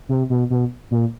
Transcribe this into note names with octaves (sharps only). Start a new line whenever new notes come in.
C3
B2
B2
A#2